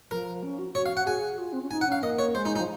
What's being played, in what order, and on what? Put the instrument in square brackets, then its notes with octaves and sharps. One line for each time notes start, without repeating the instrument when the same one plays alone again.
[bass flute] F3 [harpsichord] A#4
[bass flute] C#4
F#4
[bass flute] F#4 [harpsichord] C#5
[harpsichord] F5
F#5
[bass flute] G#4 [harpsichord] G#5
[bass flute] F4
C4
C#4
[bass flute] D#4 [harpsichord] G#5
[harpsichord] F#5
[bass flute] C#4 [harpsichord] F5
[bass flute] A#3 [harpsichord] D#5
[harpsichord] C#5
[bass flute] G#3 [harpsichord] C5
[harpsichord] D#4
D#4
[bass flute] F3